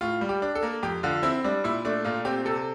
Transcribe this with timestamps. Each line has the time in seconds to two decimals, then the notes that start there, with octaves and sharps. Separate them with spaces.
0.01 A2 F4
0.21 G3
0.29 G4
0.42 D4
0.55 A4
0.63 A#3
0.83 F2 G4
1.03 D3 F4
1.23 C4 E4
1.44 G3 D4
1.64 A#2 E4
1.85 A3 D4
2.04 A#2 F4
2.25 C4 G4
2.45 C3 A4